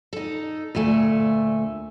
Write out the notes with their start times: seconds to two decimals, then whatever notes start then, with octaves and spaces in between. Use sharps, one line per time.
0.13 D#4 A4
0.75 D2 A#2 A3 G#5